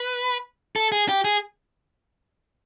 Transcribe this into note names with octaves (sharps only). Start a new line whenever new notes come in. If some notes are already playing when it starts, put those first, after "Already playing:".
Already playing: B4
A4
G#4
G4
G#4